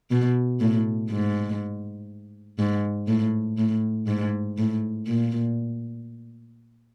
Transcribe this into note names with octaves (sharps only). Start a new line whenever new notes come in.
B2
A2
G#2
G#2
A2
A2
G#2
A2
A#2